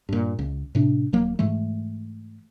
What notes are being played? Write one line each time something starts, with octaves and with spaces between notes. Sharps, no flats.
G2 A#2
C#2
A2 C3 D4
D#1 F#3 A#3
G#2 E3 G#3 A3